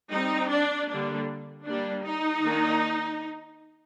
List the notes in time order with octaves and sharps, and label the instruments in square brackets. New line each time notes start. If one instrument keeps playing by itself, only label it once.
[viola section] G3 C4 D#4
D4
D3 G3 A#3 D4
G3 A#3 D4
D#4
D#3 A#3 D4